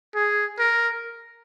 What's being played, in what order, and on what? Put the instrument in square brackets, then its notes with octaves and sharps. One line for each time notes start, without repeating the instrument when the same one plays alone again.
[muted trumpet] G#4
A#4